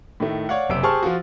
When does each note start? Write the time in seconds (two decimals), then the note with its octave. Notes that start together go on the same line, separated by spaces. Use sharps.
0.20 A2 D#3 A3
0.49 C#5 D5 F5 F#5
0.69 F#1 C3 G4 E6 D7
0.83 G4 G#4 C5 A5 C#6 F6
1.03 F3 F4 F#4